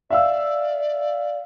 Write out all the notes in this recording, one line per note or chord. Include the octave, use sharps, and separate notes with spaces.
D5 E5 F5 E6